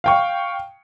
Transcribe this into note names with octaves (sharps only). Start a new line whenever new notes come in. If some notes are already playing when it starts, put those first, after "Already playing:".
F5 G5 C#6